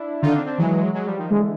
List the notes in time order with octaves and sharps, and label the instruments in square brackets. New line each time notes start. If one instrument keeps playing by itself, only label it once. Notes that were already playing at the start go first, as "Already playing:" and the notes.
Already playing: [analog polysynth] D4 E4
[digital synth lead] D3 [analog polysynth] D#4 F4
[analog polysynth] C4 D4
C4 D4
[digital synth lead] E3 [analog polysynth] F#3 G#3
[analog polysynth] F#3 G#3
F3 G3
D#3 F3
[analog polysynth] D3 E3 [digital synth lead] G#3